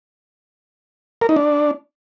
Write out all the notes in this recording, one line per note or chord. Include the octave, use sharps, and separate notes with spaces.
A#4
D#4
D4